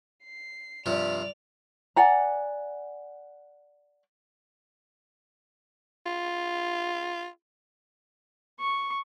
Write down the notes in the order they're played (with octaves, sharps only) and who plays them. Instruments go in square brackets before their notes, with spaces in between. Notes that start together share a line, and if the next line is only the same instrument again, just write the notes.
[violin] C7
[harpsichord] G2 C3 F3 [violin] D5 F7
[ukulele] D5 F#5 G#5 A#5
[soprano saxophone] F4
[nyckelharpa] C#6